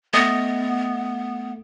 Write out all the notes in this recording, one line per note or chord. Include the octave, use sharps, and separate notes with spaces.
A3 B3 D#5